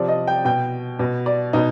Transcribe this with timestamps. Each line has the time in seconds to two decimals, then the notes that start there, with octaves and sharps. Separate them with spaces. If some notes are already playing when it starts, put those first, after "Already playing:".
Already playing: C3 F3 D5
0.09 D#5
0.27 G5
0.45 B2 G5
0.99 B2
1.26 D5
1.53 B2 D#4